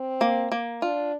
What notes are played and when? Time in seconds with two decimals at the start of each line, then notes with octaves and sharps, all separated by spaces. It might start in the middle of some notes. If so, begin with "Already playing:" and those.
Already playing: C4
0.21 A#3
0.52 A#3
0.82 D4 F4